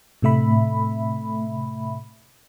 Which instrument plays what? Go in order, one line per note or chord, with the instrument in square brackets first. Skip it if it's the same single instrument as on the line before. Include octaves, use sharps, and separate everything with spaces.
[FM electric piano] A2 C3 A3 E5 B5